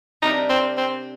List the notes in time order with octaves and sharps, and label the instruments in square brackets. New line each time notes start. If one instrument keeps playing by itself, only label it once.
[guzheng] C3 G3 D4 G4 A#4 [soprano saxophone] D#4
[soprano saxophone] C4
C4